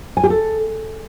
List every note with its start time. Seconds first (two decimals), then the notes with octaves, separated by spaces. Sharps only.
0.17 G#5
0.23 G4
0.30 A4